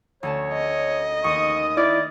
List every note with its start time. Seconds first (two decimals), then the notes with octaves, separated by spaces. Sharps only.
0.23 D2 C#4 C#5 A5
0.53 D#5
1.24 D#2 C#6 D#6
1.77 E4 D5 D6 F6 G#6